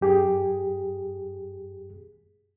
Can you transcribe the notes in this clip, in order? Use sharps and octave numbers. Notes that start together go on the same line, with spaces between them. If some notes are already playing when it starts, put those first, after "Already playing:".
F#2 G4 G#4